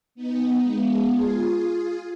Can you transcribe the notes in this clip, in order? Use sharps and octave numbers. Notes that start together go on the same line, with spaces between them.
B3 D#4
G#3 B3
F4 G#4